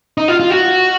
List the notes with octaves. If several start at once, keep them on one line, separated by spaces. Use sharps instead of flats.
D#4
F4
F4
F#4